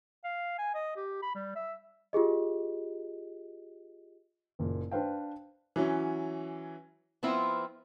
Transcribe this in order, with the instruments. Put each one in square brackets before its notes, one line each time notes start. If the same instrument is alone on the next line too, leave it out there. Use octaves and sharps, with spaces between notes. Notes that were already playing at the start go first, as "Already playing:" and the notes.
[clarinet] F5
G#5
D#5
G4
B5
G3
E5
[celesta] F4 G4 G#4 D#5
[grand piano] F#1 A#2
D4 B4 C5 F5 G5
[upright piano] E3 F#3 C#4
[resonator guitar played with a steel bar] F3 B3 C4 E4 F4